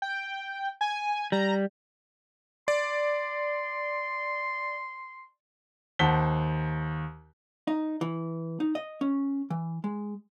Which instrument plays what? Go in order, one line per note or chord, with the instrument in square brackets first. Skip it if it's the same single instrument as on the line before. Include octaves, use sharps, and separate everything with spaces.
[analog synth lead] G5
G#5
[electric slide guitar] G3 [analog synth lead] A#5
[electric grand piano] D5 [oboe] C6
[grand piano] D#2 C5 F#5 A5 B6 G7
[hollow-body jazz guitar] D#4
E3
D#4
D#5
C#4
E3
G#3